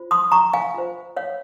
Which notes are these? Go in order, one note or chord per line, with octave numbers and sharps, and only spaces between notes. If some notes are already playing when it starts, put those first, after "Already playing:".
Already playing: F4 C5
C6 D#6
A#5 C#6
F5 G#5
F4 C5
C#5 F5